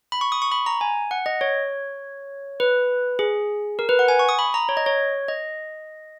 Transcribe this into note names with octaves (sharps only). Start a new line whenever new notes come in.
B5
C#6
D#6
C#6
B5
A#5
G#5
F#5
D#5
C#5
B4
G#4
A#4
B4
F#5
G#5
C#6
D#6
B5
A#5
C#5
D#5
C#5
D#5